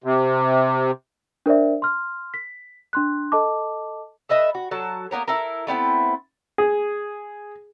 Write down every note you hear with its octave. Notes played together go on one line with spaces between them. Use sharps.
C3
D4 A#4 C5 D5 E5
C6 F6
B6
D4 C6 F#6
A4 D#5 A5 D6
A4 B4 D#5 E5
F#4
F#3 A4 A5
A#3 B3 A#4 C#5
E4 A4 A#4
A3 B3 C4 E4
G#4